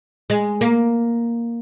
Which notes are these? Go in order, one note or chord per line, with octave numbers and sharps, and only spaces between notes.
G#3
A#3